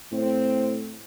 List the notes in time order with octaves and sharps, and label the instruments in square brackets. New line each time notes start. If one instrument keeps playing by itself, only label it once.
[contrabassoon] A2 [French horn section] C4